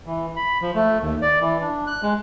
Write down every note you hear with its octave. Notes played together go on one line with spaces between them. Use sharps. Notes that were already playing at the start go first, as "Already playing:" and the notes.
E3
B5
F3
A3
D#2
D5
E3
D4
F#6
G#3